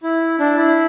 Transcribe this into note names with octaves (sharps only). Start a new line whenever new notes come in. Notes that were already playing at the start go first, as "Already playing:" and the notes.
E4
D4
E4